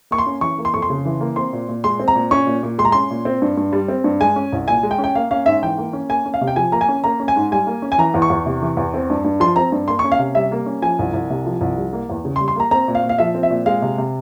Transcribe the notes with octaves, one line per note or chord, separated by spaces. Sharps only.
A#3 C#6
C6
C#4
E3 C#6
A#3
C6
F2 C#6
C6
C#3
E3
A#3
C4 C6
A#2
A#2
G#3 C6
C4
A#5
A#2
C#4 C#6
A#2
A#2
G#3 C6
A#5
C#4 C6
A#2
C4
G2
G2
G3
C4
G2
G#3 G#5
C#4
C2
A#2 G#5
G#3
G5
C#4
G5
A#3 F5
C#4 F5
G#2 E5
E3 G5
A#3
C#4
A#3 G#5
C#4
F5
C3
G5
F3 G#5
A#3 A#5
G#5
C#4
A#3 A#5
C#4
G#5
G#2
G3 G#5
A#3
C#4
G#5
E3 A#5
E2
C#6
E2
C3
E3
E2
C4
G2
G2
F3 C6
C4 A#5
G2
A#3 C6
C#6
C#4
F5
C3
G3 E5
A#3
C#4
F3 G#5
C2
C2
C3
F3
C2
G3
A#3
E2
C#3
C6
G3
C6
A#3 A#5
C4 A#5
A#2
F5
A#2
F5
F3 E5
C4
E5
A#2
G#3 F5
C3
C3